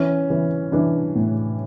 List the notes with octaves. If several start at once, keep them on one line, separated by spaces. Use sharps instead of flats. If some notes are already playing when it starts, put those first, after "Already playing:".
Already playing: E3 C#4
E3
E3 D4
A2